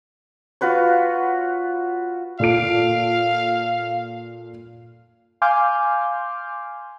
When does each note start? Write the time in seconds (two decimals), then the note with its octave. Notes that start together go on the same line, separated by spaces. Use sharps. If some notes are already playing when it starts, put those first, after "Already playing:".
0.61 F4 F#4 B4 C#5
2.40 A#2 A4 F5 D7
5.42 F5 G#5 C6 D6 F6 G6